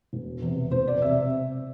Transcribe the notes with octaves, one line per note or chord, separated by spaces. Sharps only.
E1
E2 C3
E1 C5
D5
C3 E5